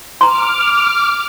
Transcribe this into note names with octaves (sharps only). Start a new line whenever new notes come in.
A#5 C6 D6 F6